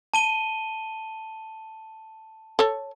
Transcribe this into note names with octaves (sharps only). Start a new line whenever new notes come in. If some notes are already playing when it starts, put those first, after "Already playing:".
A5 D#7 G7
A4 C#5